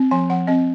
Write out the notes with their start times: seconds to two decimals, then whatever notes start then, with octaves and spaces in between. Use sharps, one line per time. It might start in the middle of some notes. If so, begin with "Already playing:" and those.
Already playing: C4
0.11 F3 G#5
0.30 F3 F#5
0.47 C4 D#5